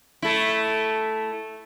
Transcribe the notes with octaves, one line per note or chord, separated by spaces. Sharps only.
A3 E4